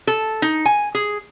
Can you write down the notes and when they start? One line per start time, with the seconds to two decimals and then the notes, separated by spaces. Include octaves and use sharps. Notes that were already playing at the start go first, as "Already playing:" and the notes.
0.07 A4
0.42 D#4
0.66 G#5
0.95 G#4